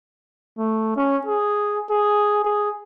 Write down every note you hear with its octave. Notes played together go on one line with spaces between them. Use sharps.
A3
C#4
G#4
G#4
G#4